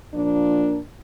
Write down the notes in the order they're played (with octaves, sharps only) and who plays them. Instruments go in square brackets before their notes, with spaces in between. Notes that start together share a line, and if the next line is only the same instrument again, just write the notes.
[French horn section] A#2 F3 A#3 D4